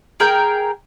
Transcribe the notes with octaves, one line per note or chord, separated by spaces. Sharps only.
G#4 A#4 G5